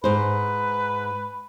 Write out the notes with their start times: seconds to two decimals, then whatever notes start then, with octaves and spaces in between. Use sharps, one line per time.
0.04 G#2 B4 C5